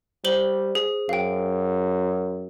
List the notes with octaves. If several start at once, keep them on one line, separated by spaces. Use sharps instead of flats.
G3 C5 F#7 G7
G#4
F#2 F5 G5